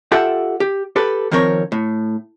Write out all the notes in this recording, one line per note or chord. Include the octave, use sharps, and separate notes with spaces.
F4 G4 A4 E5 F#5 G5
G4
G4 A4 B4
D#3 F3 C4 A#4 C#5
A2